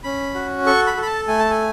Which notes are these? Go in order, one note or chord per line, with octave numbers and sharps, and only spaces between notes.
C#4 B5
F#4
A4 C#6
B5
A4
B5
A5
A3 G#5
A5
G#5